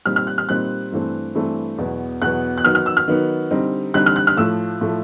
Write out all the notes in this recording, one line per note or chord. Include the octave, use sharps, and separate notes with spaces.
A#2 G3 C4 D#4 F6
F6
F#6
F6
A#2 G3 C4 D#4 F#6
G2 E3 A3 C4
G2 E3 A3 C4
E2 B2 F#3 B3
E2 B2 F#3 B3 F#6
F#6
D#3 F#3 B3 F6
F6
E6
F6
D#3 F#3 B3
D3 G3 C4 D#4
D3 G3 C4 D#4 F#6
F6
F#6
F6
A2 F3 A3 E6
A2 F3 A3